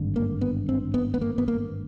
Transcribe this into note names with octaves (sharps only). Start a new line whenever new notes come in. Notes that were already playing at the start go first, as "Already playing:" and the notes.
Already playing: G#1 G2 D3
A#3
B3
C4
B3
B3
A#3
B3
A#3